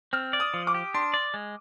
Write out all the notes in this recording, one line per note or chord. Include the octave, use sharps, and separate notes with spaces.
C4 F6
D5
D#6
F3
D6
G4
D4 C6
D5
G#3